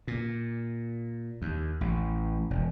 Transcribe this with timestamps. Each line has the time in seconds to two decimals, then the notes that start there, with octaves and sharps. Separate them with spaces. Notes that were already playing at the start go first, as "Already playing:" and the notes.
0.08 A#2
1.42 D#2
1.81 A1
2.50 E1